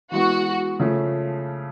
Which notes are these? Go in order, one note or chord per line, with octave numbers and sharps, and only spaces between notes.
E3 G#3 B3 F#4
C#3 F3 A3